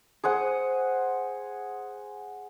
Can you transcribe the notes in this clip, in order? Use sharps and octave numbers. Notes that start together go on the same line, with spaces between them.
G#4 C5 F#5 D#6